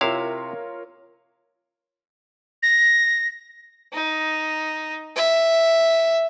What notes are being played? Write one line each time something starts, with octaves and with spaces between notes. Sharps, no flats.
C3 E4 F4 A#4 C#5 F5
A#6
D#4
E5